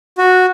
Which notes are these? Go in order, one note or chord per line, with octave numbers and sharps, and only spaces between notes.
F#4